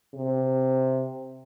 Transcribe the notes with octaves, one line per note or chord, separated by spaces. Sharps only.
C3